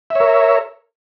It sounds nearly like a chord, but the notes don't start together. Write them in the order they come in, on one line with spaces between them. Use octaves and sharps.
E5 C#5 A#4